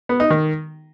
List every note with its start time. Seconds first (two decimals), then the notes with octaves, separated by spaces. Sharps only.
0.09 B3
0.20 D#4
0.30 D#3